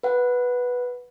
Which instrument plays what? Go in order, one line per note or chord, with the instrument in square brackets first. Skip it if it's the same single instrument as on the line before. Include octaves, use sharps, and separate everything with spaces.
[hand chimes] B4 F#5